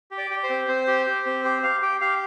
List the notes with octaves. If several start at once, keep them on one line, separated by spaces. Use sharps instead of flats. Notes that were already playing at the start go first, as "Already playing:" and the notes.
G4
D5
G4
C5
C4
C4 C5
G4
G4
C4
G4 C5
G4 F5
G4 G5
G4 F5